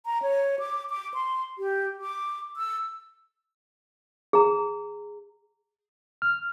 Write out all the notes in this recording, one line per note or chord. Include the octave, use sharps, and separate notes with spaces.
A#5
C#5
D6
D6
C6
G4
D6
E6
G#4 A#5
F6